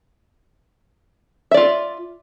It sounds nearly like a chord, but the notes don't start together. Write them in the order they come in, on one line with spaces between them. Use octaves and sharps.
E5 D5 F4